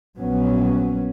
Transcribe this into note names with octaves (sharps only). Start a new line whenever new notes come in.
A#1 F#3 B3 C#4